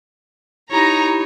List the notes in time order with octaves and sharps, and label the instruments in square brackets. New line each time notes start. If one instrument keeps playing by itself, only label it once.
[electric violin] D#4 C#5 [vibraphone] E4 G4 B5 [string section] A#5